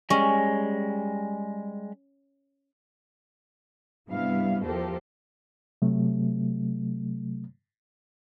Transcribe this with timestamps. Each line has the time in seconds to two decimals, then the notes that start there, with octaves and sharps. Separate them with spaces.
0.10 G3 G#3 C#4
4.09 G2 C3 G3 B3 E4 F5
4.64 E2 F3 G4 A4 A#4 C5
5.82 C3 F#3 A3